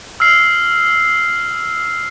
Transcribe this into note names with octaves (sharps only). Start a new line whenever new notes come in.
E6 F6 C7